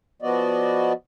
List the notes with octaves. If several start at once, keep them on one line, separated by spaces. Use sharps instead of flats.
F3 B3 F#4 D5 D#5